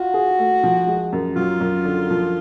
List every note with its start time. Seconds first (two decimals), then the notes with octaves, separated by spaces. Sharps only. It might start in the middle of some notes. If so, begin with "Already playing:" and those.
Already playing: F4 F#4
0.14 G#4
0.39 A3
0.63 F3
0.87 G#3
1.13 F#2
1.36 F#3 F4
1.60 F#2
1.85 D3
2.10 F3